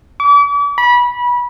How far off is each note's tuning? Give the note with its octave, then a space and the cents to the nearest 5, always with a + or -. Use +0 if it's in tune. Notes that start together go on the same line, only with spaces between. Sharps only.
D6 -40
B5 -25